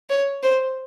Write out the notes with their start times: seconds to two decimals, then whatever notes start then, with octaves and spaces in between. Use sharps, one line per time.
0.10 C#5
0.43 C5